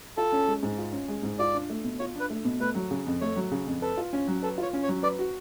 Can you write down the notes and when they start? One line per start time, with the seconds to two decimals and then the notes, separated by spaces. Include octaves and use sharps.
0.17 F4 A4
0.33 C#4
0.48 G#3
0.63 G#2
0.78 F4
0.93 C#4
1.08 G#3
1.23 G#2
1.39 F4 D5
1.54 D4
1.70 A3
1.84 B2
1.99 F4 C#5
2.15 D4 B4
2.30 A3
2.45 B2
2.60 A3 B4
2.75 F#3
2.91 C#3
3.07 F2
3.21 A3 C#5
3.36 F#3
3.51 C#3
3.67 F2
3.82 A4 B4
3.97 F4
4.13 C#4
4.28 F#3
4.43 A4 B4
4.58 F4 C#5
4.73 C#4
4.83 C#5
4.88 F#3
5.03 B4 D5
5.19 F#4